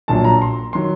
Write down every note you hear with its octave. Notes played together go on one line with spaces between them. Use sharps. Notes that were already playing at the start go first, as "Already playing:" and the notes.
A#1 A#2 F#3 A5
A#5
C6
D#3 F#3 C6